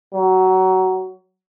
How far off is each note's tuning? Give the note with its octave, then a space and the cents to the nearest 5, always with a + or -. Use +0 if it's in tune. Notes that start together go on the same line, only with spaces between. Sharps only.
F#3 +20